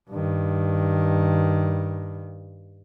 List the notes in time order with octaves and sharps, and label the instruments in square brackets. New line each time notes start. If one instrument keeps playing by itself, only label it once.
[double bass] G2 D#3